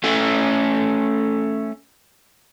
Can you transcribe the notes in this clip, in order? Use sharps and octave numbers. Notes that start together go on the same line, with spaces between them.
A3 C#4